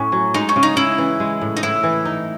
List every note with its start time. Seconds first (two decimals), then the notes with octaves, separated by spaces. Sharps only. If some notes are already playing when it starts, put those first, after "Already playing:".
Already playing: A2 C#4
0.12 F#3
0.34 G#3 D#4
0.49 C#4
0.56 C#3
0.63 D#4
0.76 C#3 E4
0.98 E3
1.20 G#3
1.41 A2
1.57 D#4
1.63 A2 E4
1.83 E3
2.05 D#4